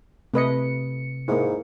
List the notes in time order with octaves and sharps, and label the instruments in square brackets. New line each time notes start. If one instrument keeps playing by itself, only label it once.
[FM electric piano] C3 C#7 [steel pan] A3 B4 D#5
[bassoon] G#2 [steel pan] A#3 E4